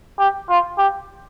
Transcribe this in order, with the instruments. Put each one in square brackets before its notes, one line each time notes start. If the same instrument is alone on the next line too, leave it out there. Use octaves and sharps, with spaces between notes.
[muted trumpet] G4
F4
G4